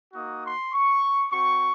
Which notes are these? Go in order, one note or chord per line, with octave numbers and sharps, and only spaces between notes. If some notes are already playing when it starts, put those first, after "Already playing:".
A#3 D#4 F#4 D#6
C6
C#6
C4 F#4 C#6